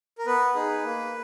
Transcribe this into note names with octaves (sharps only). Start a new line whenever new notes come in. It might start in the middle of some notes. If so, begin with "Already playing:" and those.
A#4
B3 B4
D#4 G#4
A#3